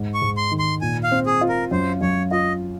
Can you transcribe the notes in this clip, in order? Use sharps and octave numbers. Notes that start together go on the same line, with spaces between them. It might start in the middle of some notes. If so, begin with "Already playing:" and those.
Already playing: G#2 G#3
C#6
G#2
C6
D#3
C6
A#2 G#5
F5
C4
G#4
F4
A#4
F#2 C5
F#2 C#5
F4 D#5